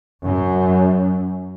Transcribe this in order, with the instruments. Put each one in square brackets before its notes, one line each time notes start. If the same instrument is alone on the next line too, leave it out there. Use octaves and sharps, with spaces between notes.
[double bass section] F#2